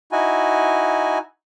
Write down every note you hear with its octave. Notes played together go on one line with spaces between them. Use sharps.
D#4 E4 F#4 G#5